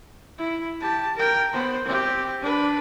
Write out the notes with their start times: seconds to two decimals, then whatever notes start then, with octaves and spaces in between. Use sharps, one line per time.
0.38 E4
0.81 G4 A5
1.17 A#4 G5
1.53 B3 C5
1.85 C4 G4
2.41 D4 B4